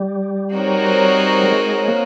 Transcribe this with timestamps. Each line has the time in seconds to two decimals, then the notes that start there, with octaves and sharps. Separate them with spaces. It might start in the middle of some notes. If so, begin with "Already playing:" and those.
Already playing: G3
0.55 C4 D#4 F#4 A#4 C#5
1.43 G#3
1.88 A#3